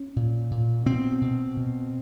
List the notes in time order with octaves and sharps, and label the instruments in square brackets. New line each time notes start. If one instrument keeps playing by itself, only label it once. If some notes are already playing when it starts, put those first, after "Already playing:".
Already playing: [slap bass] C#4
A#2
A#2
B2 C4
B2
B2